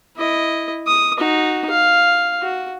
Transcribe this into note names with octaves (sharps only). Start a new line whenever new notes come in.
E4 D#5
D#6
D#4 F#4
F5
F#4